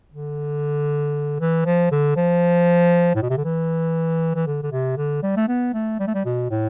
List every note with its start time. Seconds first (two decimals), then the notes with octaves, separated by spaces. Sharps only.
0.13 D3
1.40 E3
1.66 F3
1.91 D3
2.16 F3
3.15 A2
3.22 B2
3.30 C3
3.37 D3
3.44 E3
4.35 E3
4.46 D3
4.63 D3
4.71 C3
4.97 D3
5.23 G3
5.36 A3
5.48 B3
5.74 A3
5.99 G3
6.07 A3
6.14 G3
6.25 B2
6.50 A2